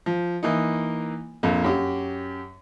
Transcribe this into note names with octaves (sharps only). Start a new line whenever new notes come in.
F3
E3 A#3 D#4
A#1 F2 A#3
F#2 G4